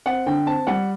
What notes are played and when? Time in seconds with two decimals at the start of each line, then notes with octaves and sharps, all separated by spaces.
0.06 C4 F#5
0.26 D3 G5
0.46 C4 A5
0.67 G3 F#5